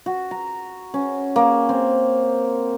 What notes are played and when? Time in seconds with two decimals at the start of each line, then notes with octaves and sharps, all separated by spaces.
0.06 F#4
0.31 A#5
0.94 C#4
1.36 A#3
1.69 C4